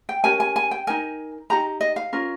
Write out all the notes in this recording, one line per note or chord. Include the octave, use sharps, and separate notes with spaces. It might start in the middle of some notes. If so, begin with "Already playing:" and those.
G5
C#4 G4 A#4 G#5
G#5
G#5
G5
D#4 A#4 G#5
D#4 G4 A#4 A#5
D#5
F5
C#4 F4 A#4